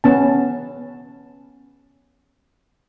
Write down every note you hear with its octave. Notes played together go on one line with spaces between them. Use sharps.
B3 C#4 A5